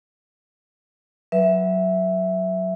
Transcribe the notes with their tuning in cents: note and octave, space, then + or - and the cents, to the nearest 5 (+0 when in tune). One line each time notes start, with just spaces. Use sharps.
F#3 +0 B4 +0 E5 +0